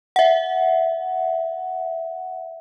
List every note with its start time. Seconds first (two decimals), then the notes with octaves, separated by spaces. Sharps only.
0.16 E5 F#5